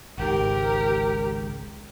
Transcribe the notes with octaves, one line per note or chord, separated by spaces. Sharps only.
G#1 C#2 G#2 G4 A#4